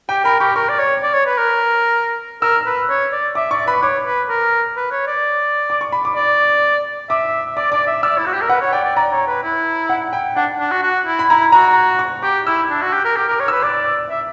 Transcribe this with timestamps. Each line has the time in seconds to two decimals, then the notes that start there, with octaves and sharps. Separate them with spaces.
0.09 G4 G5
0.24 A#4 B5
0.40 G4 C#6
0.56 A#4 C#6
0.69 D5
0.79 C#5
1.02 D5
1.14 C#5
1.26 B4
1.38 A#4
2.42 A#4 E6
2.66 B4
2.89 C#5
3.12 D5
3.35 E5 D6
3.51 D5 C#6
3.67 B4 B5
3.83 C#5 D6
4.06 B4
4.29 A#4
4.76 B4
4.91 C#5
5.07 D5
5.70 D6
5.81 C#6
5.92 B5
6.05 D6
6.15 D5
7.09 E5 D6
7.56 D5 D6
7.72 D5 D6
7.87 E5
8.03 D5 E6
8.18 E4
8.26 F#4
8.34 G4
8.42 A#4
8.49 B4 F#5
8.61 C#5
8.73 D5 G5
8.84 D5
8.96 D5 A#5
9.12 C#5
9.27 B4
9.43 E4
9.89 F#5
10.13 G5
10.36 D4 F#5
10.60 D4
10.71 F#4
10.83 F#4
11.06 E4
11.19 B5
11.29 E4 A#5
11.52 F#4 A#5
11.99 C#6
12.22 G4 D6
12.46 E4 E6
12.70 D4
12.82 F#4
12.93 G4
13.04 A#4
13.16 G4 D6
13.28 A#4
13.31 D6
13.40 C#5
13.48 B4 E6
13.63 D5 D6
14.10 E5